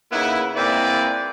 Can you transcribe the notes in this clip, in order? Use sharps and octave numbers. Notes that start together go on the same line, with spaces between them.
C#3 A#3 B3 D#4 E4
G#3 A#3 C4 E4 B4 D5